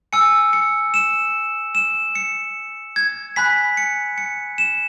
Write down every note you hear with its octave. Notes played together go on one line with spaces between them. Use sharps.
G#5 E6 C#7
C#7
E7
E7
C#7
G#6
G#5 B5 F#6 B6
C#7
C#7
E7